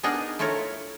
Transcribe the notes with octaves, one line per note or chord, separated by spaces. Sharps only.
B3 D4 D#4 G#4 A#4
A3 E4 F4 A#4 C#5